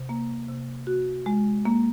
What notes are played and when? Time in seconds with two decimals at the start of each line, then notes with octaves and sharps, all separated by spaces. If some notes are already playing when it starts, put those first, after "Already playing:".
Already playing: C3
0.09 A#3
0.48 C3
0.87 F#4
1.26 G#3
1.65 A#3